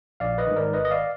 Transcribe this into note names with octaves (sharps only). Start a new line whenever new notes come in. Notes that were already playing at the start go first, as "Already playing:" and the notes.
A#1 D5 F5
B4 D#5
G#2 D#3
A#4 D5
G#1 B4 D#5
D#5
D5 F5